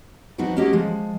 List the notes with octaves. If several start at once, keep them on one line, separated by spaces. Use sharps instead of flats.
F3 F#3 B3 C4 D#4 F#5
A3 A#3 C#4 F#4 G4 D#5
F3 G#3